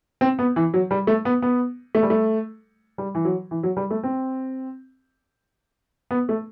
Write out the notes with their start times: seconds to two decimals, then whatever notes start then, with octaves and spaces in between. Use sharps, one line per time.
0.21 C4
0.39 B3
0.56 E3
0.74 F#3
0.91 G3
1.07 A3
1.25 B3
1.42 B3
1.95 A3
2.03 G3
2.10 A3
2.98 G3
3.15 E3
3.25 F#3
3.51 E3
3.63 F#3
3.77 G3
3.90 A3
4.03 C4
6.11 B3
6.29 A3